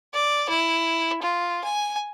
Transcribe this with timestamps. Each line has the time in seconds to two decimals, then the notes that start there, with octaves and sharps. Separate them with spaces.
0.14 D5
0.49 E4
1.22 F4
1.64 G#5